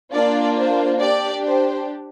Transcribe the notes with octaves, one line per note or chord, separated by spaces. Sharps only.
A#3 D4 F4 D5
C5
D4 G4 D5
C5